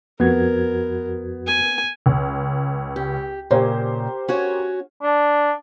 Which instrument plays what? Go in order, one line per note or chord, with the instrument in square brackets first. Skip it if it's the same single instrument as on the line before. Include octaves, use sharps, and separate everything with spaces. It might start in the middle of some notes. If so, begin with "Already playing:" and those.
[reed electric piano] F2 F#4 G#6 [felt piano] B3 [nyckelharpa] A#4
[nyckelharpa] G#5
[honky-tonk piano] C#2
[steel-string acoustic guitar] G4
[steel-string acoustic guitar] A#2 C#3 [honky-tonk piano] G4 A#4 C5
[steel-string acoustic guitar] C#4 F#4 C#5
[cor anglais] D4